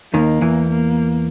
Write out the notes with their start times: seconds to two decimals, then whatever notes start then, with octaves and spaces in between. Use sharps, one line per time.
0.13 D#2 D#3 A#3
0.41 E2 E3
0.69 A#3